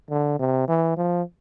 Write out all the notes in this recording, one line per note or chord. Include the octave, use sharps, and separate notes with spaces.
D3
C3
E3
F3